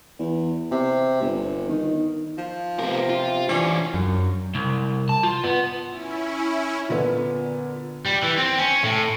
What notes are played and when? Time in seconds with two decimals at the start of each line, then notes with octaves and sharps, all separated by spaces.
0.19 E2
0.71 C3
1.21 G1
1.69 D#3
2.38 F3
2.79 C3 B3 A#4
3.10 F4
3.49 E3 C#4 D4
3.94 F#2
4.55 C2
5.09 A5
5.23 F4
5.44 B3
5.89 C#4 E4
6.88 A#2 D3 B3
8.06 G3
8.23 E3
8.38 C4
8.59 C#4
8.84 A2